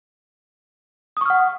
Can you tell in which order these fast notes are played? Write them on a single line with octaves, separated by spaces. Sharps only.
D#6 C#6 F6 F#5